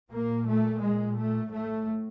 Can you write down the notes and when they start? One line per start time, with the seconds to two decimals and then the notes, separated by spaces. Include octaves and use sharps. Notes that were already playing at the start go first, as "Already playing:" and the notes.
0.11 A#2 A#3
0.46 A3
0.81 G#3
1.16 A3
1.51 A2 A3